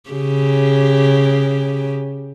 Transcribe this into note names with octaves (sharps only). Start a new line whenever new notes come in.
C#3 G4